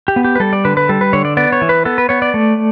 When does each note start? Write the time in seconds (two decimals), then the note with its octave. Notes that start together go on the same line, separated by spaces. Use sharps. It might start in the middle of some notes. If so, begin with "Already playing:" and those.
0.08 G4
0.16 B3
0.25 G4
0.35 B4
0.40 G3 A4
0.53 D5
0.65 D3 B4
0.77 B4
0.89 G3 A4
1.01 B4
1.13 D3 C#5
1.25 D5
1.37 B3 D5
1.52 C#5
1.61 E3
1.69 B4
1.85 B3 A4
1.98 B4
2.09 B3 C#5
2.22 D5
2.34 A3